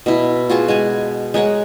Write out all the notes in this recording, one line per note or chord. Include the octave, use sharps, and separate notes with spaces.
B2 E4
F4 F#4 G#4 A5
G#3 F#5 G#5
G#3 A#4 C#5 F#5